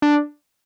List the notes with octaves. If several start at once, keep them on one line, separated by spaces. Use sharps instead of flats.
D4